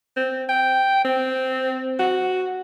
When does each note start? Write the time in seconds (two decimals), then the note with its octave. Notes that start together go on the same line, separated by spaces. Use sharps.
0.17 C4
0.49 G5
1.05 C4
1.99 F#4